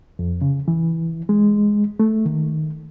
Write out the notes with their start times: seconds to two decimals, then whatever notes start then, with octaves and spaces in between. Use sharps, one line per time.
0.19 F2
0.42 C#3
0.68 E3
1.29 G#3
2.00 A3
2.26 D#3